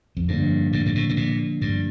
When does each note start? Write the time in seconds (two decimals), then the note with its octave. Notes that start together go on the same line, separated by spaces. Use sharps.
0.17 F2
0.28 G2 D3 F3 A#3 D4
0.73 G2
0.86 G2
0.95 A2
1.09 A2
1.17 A#2
1.61 G2